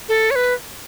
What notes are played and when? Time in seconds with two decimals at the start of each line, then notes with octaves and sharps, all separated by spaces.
0.09 A4
0.31 C#5
0.36 B4